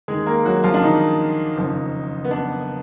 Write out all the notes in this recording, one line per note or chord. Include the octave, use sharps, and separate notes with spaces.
D#2 D#3 G#3 G#4
A#3 A#4
F#3 F#4
F3 F4
D4
D#3 D#4
F#1 F2 F3
B3
D4